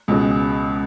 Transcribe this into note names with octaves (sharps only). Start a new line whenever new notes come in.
C#2 B2 G#3